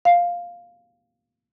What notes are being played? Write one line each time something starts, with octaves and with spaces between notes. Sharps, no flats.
F5